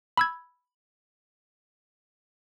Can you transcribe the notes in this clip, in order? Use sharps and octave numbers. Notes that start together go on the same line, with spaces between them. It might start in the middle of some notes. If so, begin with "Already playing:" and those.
B5 E6 G#6